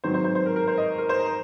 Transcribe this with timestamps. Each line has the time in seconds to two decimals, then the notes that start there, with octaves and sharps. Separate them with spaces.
0.04 G#2 D#3 F#3 C4 C5
0.14 C5
0.24 C5
0.35 C5
0.46 A#4
0.56 A#4
0.67 C5
0.78 D#5
0.98 A#4
1.09 C5
1.20 A#5